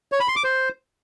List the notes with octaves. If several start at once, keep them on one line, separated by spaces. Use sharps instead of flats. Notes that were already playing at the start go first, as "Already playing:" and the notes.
C#5
B5
C6
D6
C5